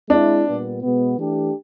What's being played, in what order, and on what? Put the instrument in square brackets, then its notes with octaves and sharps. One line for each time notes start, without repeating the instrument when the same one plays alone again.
[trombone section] G#3 C4 E4 [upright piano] D4
[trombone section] A#2 G3 B3
B2 G#3 B3
E3 A3 D4 G4